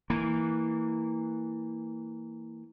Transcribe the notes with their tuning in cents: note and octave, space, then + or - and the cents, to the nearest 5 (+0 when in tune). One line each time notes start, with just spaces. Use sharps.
E3 -15 A#3 -15